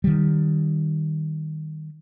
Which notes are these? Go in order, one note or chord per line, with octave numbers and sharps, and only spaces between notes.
D#3 G3